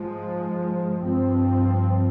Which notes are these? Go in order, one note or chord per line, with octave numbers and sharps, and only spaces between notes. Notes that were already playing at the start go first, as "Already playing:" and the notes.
Already playing: G#2 F3 G#3
G2 F3 C4